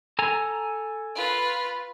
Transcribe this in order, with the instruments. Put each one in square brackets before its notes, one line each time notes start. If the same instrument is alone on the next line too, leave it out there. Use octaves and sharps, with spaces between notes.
[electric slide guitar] A4 G#5 A#5
[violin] F4 B4